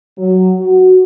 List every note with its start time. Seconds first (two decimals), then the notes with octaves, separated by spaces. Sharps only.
0.18 F#3
0.59 F#4